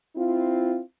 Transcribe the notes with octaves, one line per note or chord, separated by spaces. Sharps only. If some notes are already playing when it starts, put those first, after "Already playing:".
C4 E4 F4